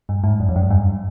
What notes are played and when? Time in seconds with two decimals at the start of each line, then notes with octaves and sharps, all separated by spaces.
0.09 G2
0.24 G#2
0.40 F#2
0.49 F2
0.56 F#2
0.70 G2